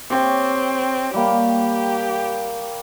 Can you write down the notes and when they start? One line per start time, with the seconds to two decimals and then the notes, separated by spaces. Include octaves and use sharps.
0.10 C4 G4 C#5 G5
1.14 G3 A#3 G4